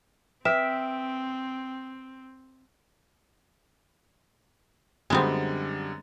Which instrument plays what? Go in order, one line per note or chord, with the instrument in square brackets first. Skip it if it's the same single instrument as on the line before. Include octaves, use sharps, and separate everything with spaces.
[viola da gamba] C4 [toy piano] B4 [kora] E5 [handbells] G5 D#6
[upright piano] F#2 D3 G3 [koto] G#3 B3 C4